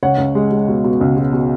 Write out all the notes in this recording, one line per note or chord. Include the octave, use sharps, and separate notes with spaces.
C#2 C#5 F#5
C#2
G#3
G#3
B2
B2
C#2
B2
B2